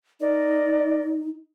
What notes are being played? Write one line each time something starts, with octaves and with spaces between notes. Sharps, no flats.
D#4 A#4 D5 D#5